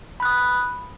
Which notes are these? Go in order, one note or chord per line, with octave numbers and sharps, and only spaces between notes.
B5 D#6 F#6